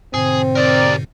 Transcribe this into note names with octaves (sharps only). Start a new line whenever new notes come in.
G#2 B2 D3 C4 G#4
G4 A#4 D5